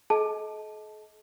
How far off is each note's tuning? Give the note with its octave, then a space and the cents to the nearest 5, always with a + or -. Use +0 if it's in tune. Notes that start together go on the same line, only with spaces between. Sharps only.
A4 -45 D#5 +25 A5 -10